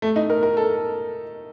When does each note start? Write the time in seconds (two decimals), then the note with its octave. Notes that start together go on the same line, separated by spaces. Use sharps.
0.02 A3
0.16 D#4
0.30 A#4
0.43 A#4
0.57 A4